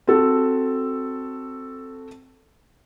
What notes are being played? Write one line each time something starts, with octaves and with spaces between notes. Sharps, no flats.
C4 F#4 A4